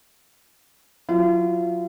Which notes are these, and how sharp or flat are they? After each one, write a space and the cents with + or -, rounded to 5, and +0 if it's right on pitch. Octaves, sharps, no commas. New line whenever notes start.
F#3 -35 F4 -40